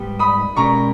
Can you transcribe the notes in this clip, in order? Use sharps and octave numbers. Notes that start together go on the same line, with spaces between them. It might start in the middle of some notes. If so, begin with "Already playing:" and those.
Already playing: G#2 G3 B3 G4
B5 D#6
B2 G#3 C#4 G4 A#4 A#5 C#6